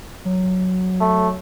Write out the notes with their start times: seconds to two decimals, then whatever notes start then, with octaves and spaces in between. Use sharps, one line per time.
0.25 F#3
1.01 A3